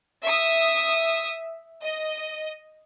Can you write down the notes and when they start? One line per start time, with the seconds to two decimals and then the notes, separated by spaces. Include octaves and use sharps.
0.23 E5 D#6
1.82 D#5